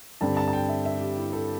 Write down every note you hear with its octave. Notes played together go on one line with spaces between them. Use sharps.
G2 D3 G3 C4 A5
A5
A5
G5
E5
E5
G4
E4
A4